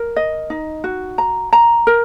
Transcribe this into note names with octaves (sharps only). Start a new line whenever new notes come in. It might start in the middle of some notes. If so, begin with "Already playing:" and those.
Already playing: A#4
D#5
D#4
F#4
A#5
A#5
A#4